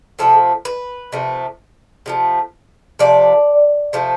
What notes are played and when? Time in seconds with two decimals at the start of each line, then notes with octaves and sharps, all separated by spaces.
0.19 C3 F3 A3 A4
0.65 B4
1.12 C3 F3 A3
2.06 C3 F3 A3
2.99 C3 F3 A3 D5
3.93 C3 F3 A3